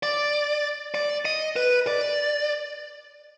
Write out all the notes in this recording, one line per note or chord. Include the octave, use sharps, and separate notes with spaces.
D5
D5
D#5
B4
D5